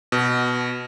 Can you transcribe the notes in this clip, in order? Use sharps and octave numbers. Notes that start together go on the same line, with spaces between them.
B2